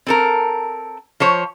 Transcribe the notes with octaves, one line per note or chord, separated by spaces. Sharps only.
C4 A4 A#4
F3 C5 C#5